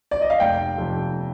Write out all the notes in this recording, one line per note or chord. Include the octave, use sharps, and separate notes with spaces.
D5
D#5
F5
F1 G5
F2 C3